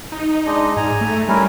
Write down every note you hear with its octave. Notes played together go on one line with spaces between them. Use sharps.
D#4
G#3 D4 D#5
G#2 G#5 A#5
A3
G3 C#4 E4 A#4